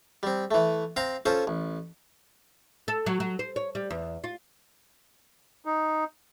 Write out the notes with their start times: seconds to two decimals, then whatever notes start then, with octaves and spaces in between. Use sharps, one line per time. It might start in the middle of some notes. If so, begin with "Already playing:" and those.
0.23 G3 C4
0.51 E3 A3
0.96 C4 F5 A#5 C6
1.26 C#4 F4 A4 C5
1.47 A1
2.88 A4
3.06 F#3
3.20 F#3
3.39 C5
3.56 C#5
3.75 G3
3.91 E2
4.24 F4
5.65 D#4